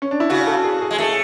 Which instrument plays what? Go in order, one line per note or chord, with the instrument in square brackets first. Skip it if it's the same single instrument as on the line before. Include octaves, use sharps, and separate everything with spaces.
[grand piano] C#4
D4
E4
[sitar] C#3 [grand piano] F#4
[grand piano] A4
G#4
G#4
[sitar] G#3
[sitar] A3 [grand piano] G#4